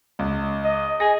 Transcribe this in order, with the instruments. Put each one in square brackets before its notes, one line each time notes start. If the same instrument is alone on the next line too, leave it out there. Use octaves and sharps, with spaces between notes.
[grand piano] C#2
[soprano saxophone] D#5
[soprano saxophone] G#4 [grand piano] A#6